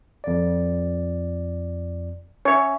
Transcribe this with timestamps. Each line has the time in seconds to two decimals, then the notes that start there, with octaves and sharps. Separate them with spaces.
0.24 F2 D5
2.45 C#4 C#5 E5